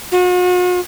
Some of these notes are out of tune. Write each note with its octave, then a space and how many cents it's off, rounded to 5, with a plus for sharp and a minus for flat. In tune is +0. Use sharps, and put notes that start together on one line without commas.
F#4 -45